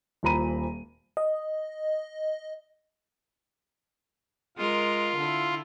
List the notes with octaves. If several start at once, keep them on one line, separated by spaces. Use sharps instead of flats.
D#1 A#2 C5 A#5 B5 D#7
D#5
G#3 F4 A#4
D3 E4